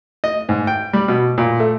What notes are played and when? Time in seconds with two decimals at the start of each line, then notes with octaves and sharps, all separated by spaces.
0.24 D#5
0.49 G#2
0.67 G5
0.93 G3
1.08 B2
1.38 A#2
1.60 A3